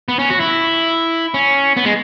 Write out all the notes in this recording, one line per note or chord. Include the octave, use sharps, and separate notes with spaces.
B3
C#4
F#4
E4
C#4
B3
G#3